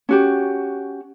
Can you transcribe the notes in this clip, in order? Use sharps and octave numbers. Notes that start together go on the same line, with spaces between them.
C#4 F#4 G4